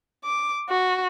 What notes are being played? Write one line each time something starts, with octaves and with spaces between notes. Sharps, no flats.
D6
F#4